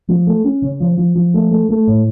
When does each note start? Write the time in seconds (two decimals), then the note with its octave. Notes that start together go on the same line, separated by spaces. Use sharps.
0.08 F3
0.27 A3
0.44 C#4
0.62 C#3
0.80 F3
0.97 F3
1.15 F3
1.34 A3
1.51 A3
1.69 A3
1.88 A2